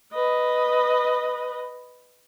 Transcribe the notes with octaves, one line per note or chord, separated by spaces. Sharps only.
B4 D#5